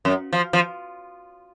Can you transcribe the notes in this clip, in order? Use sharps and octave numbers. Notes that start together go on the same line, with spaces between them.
F#2
F3
F3